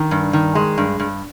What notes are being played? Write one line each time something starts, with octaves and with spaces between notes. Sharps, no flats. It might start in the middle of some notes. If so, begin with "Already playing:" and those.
Already playing: D#3
G2
D#3
G#3
G2
G2